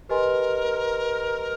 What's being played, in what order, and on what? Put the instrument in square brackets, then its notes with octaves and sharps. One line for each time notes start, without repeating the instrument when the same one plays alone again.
[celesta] G4 B4 D#5 G#5 C6 [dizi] A#4